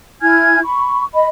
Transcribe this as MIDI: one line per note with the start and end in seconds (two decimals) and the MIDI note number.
0.21 0.59 64
0.21 0.59 80
0.21 0.59 89
0.21 0.59 92
0.64 1.04 83
0.64 1.04 85
1.14 1.27 75
1.14 1.27 83